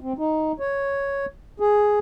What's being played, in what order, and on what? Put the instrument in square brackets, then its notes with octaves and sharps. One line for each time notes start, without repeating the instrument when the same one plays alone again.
[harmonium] C4
D#4
C#5
G#4